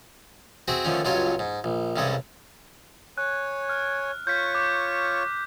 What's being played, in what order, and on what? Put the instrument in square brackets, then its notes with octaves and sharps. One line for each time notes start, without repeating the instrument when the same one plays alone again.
[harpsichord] C4 F#4 G#4 E5
D3 D#3 F3 A3 C#4
C#2 G2 F#3 F4 C#5 G#5
G#2
A#1
C2 G2 C#3 G#3 A4
[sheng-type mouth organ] C#5 G#5 [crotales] F#6
[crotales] F6
[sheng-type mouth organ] F4 C#5 C#6 [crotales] G6 B6
[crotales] D6